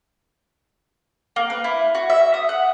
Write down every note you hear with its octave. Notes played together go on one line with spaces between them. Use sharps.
A#3
B4
E4
F#4
E5
D#6
F#5